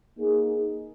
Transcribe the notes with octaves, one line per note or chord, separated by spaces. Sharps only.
A#3 D#4 G#4